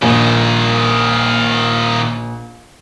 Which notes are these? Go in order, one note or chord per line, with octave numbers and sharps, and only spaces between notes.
A#1 A#2 D#3